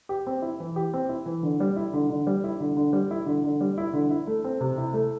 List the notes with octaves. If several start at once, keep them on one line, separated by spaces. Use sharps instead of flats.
G4
C4
E4
E3
G4
C4
E4
E3
D3
G3
E4
D3
D3
G3
E4
D3
D3
G3
E4
D3
D3
G3
E4
D3
E4
A3
C4
C3
E4
A3